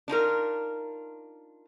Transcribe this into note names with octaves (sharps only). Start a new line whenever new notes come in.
D4 D#4 F4 A#4